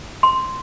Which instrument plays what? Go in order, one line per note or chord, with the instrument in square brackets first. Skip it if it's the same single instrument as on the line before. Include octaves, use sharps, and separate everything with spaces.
[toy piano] C6